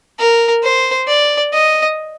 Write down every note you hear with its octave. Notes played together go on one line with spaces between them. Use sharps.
A#4
C5
D5
D#5